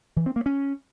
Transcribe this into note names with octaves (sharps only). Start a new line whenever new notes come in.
E3
C4
A#3
C#4